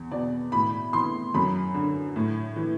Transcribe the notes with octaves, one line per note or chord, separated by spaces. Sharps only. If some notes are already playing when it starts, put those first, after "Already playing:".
Already playing: E2
B2 D5
A2 B5
E3 C6
F#2 B5
D3
A2
E3